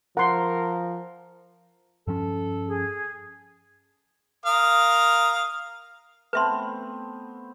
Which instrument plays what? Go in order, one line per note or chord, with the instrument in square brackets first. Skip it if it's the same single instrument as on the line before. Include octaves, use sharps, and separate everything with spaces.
[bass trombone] F3 [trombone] A#4 [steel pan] F#5 C6
[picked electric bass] G2 F3 C#4 [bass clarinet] A4
[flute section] G#4
[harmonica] A#4 F5 D#6
[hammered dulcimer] A3 B3 C4 [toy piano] B4 E5 C6